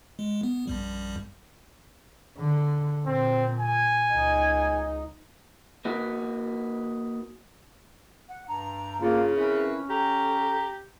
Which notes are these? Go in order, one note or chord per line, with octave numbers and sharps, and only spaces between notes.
G#3
B3
A#1 F#2 G3
D3
A#2 C4
G#5
C#2 D#4
A#3 D#4 F#4 B4
F#5
G2 D4 A#5
C#3 A#3 F4
C4 C#4 E4 A#4 B4
G4 A4 A#5